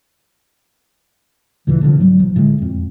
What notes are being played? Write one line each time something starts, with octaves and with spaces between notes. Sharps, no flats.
D2 A#2 C#3 E3
C2 D3 D#3 F3
G#2 F#3 G3
B1 F3
A2 D3 E3 G#3
E1 F2